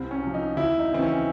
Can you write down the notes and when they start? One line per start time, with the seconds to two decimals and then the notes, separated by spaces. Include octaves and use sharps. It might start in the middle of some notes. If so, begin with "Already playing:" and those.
Already playing: C2 C4
0.11 C#4
0.23 C3 F3
0.34 D#4
0.57 D#2 E4
0.79 D#4
0.91 C#3 E3 C4
1.02 C#4